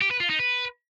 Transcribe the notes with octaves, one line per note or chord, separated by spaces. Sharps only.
G4
B4
F4
D#4
B4